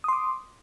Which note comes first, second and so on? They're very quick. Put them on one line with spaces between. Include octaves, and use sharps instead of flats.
D#6 C6 D6